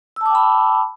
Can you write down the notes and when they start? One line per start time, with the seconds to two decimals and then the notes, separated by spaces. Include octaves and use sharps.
0.16 E6
0.21 A5
0.26 D6
0.30 G5
0.35 B5